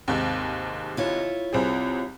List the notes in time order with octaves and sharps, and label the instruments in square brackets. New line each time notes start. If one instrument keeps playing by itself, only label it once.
[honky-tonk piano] D#2 G#2 C3
[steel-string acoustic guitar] E4 F4 C#5
[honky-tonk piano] C2 C4 G#4